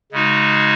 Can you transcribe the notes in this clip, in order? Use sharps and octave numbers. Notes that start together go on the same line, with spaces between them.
C#3 G#3 D#4 F#4